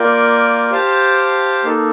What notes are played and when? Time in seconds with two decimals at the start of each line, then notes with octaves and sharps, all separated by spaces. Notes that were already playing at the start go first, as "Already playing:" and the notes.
Already playing: A#3 F4 A#4 D5 G5
0.71 G4 C5 F5 A5
1.64 A#3 D#4 A4